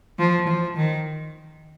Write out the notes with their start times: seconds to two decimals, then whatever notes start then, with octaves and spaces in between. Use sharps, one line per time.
0.19 F3
0.47 F3
0.76 D#3